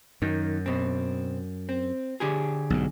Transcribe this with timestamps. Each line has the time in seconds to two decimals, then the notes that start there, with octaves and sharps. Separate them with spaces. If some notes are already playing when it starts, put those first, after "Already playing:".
0.22 F#2 D#3
0.66 B2 C4
1.69 C4
2.20 D3 G4 G#4
2.70 B1 G#2